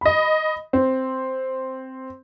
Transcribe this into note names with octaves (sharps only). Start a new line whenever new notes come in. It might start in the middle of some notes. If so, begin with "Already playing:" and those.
D#5 B5
C4